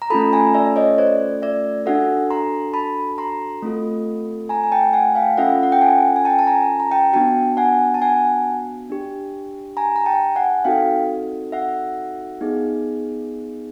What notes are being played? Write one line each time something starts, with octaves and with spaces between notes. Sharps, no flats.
A#5
A3 C#4 F4 A4 A5 B5
G#5 A#5
D5 E5
C#5 D#5
C5 D5
D5 E5
D4 F#4 A4 E5 F#5
A#5 C6
A5 B5
A#5 C6
A3 C4 F4 A4
G#5 A#5
G#5
G5 A5
F#5 G#5
F5 G5
C#4 F4 A4 E5 F#5
F#5
G5
F#5 G#5
G#5
G5 A5
A5
G#5 A#5
A#5
G5 A5
B3 D4 F#4 G5 A5
F#5 G#5
A5
F#5 G#5
D4 G4
G#5 A#5
A#5
G5 A5
F#5 G#5
C4 D#4 F#4 A4 F5 G5
E5 F#5
B3 D#4 G#4